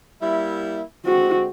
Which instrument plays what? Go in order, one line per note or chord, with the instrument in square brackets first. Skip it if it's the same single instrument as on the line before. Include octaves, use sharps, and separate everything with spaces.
[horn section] G3 A#3 E4
[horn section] D3 G#3 C4 [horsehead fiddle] F#4